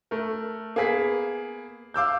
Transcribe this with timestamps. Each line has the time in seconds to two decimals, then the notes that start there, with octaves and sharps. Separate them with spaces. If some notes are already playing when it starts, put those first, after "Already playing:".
0.11 A3 A#4
0.76 A#3 B3 G#4 B6
1.94 F5 D6 E6 G6